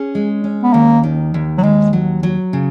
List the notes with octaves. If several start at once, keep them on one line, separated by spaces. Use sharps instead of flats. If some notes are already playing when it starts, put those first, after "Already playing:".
Already playing: C#4 G#4
G#3
C#4
B3
D#2 A#3
D#3
D#2
F#3
D#2 G#3
F#3
F#3
C#3